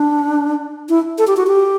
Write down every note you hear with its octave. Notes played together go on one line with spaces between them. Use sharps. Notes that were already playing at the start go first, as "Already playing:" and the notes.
Already playing: D4
E4
A4
G4
F#4
G4